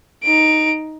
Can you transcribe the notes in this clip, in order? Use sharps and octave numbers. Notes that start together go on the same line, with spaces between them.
D#4 D7